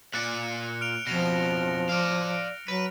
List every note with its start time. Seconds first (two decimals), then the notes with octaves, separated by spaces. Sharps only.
0.14 A#2 D5 F#6 C#7
0.81 F6 D7 F7
1.07 F2 B2 F3 A#6 F7
1.89 D5 F5
2.68 F#3 B4